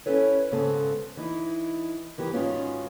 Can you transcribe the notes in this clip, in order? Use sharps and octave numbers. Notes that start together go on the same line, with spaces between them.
C#4 D#4 E4 A4 B4 C#5
G#2 C#3 B3 C4 A4
E3 D#4 E4
G2 E3 B3 G4 A#4
G#2 D#3 B3 C#4 F4 F#4